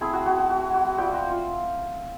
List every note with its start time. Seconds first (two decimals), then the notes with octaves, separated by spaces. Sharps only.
0.01 A3 C4 E4 G#4
0.13 F#4
0.26 F#4
0.38 F#4
0.50 F#4
0.74 F#4
0.98 G3 C4 F4 G4
1.14 F#4
1.30 F4